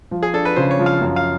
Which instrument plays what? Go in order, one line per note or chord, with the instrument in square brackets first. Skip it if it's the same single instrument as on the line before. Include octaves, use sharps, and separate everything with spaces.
[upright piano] F3
[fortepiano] G#4
[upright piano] D4 [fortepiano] A4
[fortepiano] B4
[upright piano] C#3 [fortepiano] C5
[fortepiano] C#5
[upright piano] F3
[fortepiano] F5
[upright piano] F#2
[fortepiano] F5